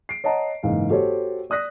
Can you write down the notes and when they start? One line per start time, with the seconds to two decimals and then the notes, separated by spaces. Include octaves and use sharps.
0.09 C7 D7
0.24 C#5 D#5 F#5 A5 A#5
0.63 F#1 G#2 E3 F5
0.89 F#4 G4 A4 C5 C#5
1.50 D5 D#6 F#6 A#6 B6